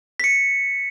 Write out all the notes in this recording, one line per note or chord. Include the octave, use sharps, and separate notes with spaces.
B6 C#7